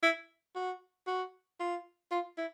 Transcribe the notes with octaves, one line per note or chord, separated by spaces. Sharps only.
E4
F#4
F#4
F4
F4
E4